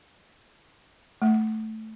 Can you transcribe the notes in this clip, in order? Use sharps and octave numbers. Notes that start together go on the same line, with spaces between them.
A3